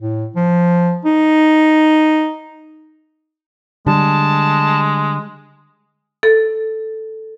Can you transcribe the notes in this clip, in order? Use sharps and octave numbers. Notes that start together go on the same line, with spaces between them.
A2
F3
D#4
D3 G3 G#3 A5
A4